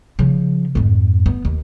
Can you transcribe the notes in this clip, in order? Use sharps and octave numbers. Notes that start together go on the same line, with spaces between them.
C#3 F3
F2 G#2
B3
D#2